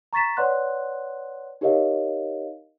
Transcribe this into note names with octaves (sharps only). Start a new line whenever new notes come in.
A#5 C#6 A6 B6 E7
B4 C#5 D5 F#5 C6 F#6
D#4 G4 A#4 C#5 D#5 F5